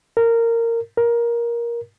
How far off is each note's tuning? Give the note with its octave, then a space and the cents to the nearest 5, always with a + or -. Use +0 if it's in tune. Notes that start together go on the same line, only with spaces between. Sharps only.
A#4 -15
A#4 +15